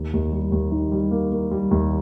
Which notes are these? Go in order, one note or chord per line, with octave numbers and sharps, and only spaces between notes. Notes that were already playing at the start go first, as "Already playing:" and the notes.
Already playing: D#2
D#2
G3
D#2
D#3
G3
A#3
A#3
G3
D#2